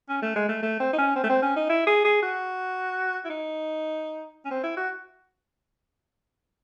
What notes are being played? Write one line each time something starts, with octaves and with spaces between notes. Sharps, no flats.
C#4
A3
G#3
A3
A3
C4
D#4
C#4
C4
A3
C4
C#4
D#4
E4
G#4
G#4
F#4
E4
D#4
C#4
C4
E4
F#4